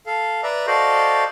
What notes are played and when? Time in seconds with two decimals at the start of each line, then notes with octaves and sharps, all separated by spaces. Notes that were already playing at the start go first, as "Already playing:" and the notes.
0.06 A4 F5
0.43 B4 D5 E5 A#5
0.67 F#4 A4 C5 D5 D#5 F5